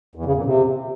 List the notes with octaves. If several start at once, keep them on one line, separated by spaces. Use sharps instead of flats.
E2
C#3
A#2
C3